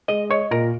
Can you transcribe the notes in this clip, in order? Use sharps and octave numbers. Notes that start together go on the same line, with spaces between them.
G#3 D#5
C#5 D#5
A#2 A#4